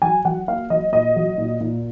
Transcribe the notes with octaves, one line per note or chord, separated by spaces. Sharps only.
F#3 G#5
F#3 F#5
A#3 F5
F#3 D#5
A#2 D#5
F#3
A#2
A#2